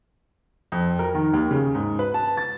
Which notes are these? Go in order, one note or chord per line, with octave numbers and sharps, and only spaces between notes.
F2
A#4
D#3
D#2
C#3
G#2
B4
A5
A6